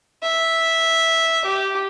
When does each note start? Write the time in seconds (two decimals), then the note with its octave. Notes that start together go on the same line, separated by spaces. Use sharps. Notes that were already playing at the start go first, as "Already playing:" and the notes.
0.23 E5
1.45 G4